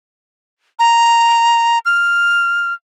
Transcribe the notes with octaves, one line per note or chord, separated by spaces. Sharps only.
A#5
F6